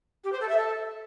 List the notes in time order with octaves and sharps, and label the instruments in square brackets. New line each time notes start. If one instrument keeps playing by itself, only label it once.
[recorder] G4
C5
A4
E5
A4